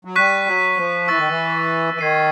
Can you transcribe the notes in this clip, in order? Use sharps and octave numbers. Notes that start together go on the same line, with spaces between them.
F#3
G3 C#6 F#6 B6 D#7
F#3
F3
E3 C#6 E6 A6
D#3
E3
E3
D#3 G#6 C7 D#7